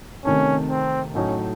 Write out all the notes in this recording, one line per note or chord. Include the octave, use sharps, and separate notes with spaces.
C3 D#3 A3 C#4
C4
A2 F#3 A3 C#4 D#4